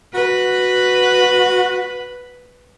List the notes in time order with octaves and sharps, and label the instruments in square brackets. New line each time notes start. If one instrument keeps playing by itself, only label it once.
[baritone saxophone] F#4 [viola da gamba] B4